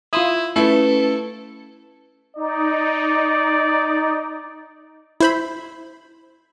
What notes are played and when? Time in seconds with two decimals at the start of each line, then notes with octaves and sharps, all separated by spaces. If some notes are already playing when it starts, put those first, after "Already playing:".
0.13 E4 F4 C6 D#6
0.56 A3 C#4 E4 A4 B4
2.36 D#4 D5
5.20 E4 C5 B5